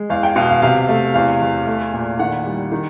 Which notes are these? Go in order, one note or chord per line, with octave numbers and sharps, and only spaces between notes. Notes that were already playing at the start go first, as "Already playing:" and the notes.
Already playing: G#3
E2 F5
G5
B2 F5
F5
C3 F5
A3
E2 F5
E2
A3
A#2
D#3 F#5
G3
D#3